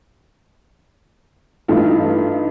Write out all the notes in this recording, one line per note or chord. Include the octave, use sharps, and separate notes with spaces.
G2 E3 A3 D#4 F4